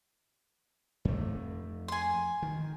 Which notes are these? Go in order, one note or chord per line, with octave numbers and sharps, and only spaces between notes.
F2 A3
G#5 C6
D#3